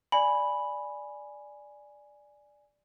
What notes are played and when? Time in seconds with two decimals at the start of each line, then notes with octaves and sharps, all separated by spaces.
0.12 D5 G#5 B5